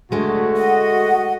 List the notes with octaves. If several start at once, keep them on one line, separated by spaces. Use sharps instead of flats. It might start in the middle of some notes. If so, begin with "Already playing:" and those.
D2 G#3 A3 F#4
D#5 F#5